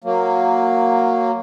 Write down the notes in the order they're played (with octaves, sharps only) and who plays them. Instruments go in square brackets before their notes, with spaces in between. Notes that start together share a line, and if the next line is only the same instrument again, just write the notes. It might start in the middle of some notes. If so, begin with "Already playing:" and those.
[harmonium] F#3 A#3